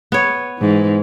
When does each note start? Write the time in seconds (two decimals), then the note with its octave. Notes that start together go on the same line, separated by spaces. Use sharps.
0.12 B3 C#5
0.59 G#2 E3